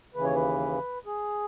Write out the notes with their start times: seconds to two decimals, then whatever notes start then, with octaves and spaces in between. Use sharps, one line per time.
0.15 D#2 C#3 E3 B4
0.24 C#5
0.35 B4
1.06 G#4